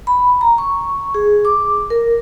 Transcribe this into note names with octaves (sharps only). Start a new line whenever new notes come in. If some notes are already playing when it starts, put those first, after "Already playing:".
B5
A#5
C#6
G#4
D6
A#4